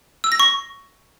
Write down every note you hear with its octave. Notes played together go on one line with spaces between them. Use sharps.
E6
A#6
C#6